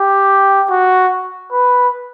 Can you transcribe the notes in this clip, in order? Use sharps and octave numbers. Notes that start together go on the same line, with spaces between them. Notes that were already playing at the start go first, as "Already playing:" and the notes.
Already playing: G4
F#4
B4